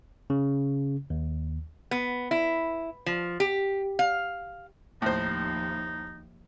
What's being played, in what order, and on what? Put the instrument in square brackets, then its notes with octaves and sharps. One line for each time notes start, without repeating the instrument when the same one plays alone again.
[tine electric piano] C#3
D#2
[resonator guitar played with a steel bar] B3
E4
F3
G4
F5
[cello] D#2 F3 [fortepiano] A2 C5 [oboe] D#4